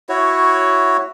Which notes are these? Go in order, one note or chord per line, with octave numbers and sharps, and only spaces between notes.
E4 F#4 C#5